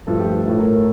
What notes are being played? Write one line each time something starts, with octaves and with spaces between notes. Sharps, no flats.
G2 F3 A3 A4
G4
G4
A2 A3 A4
A#4
A#4